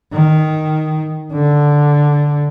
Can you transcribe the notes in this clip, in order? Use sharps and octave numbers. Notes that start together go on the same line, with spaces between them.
D#3
D3